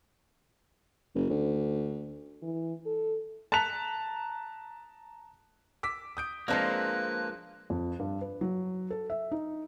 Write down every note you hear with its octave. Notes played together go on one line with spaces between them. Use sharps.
F#1
D2
E3
A4
A5 A#5 F#6 B6 F7
D6 E6 B6
D#6 G6 D7
F3 G#3 A#3 C4 D4 B4 C5 A5
F2
G2
B4
F#3
A4
E5
D#4